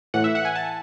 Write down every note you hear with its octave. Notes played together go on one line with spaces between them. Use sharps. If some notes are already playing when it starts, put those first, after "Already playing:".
A2 E3 F#5
E5
F#5
G#5
A5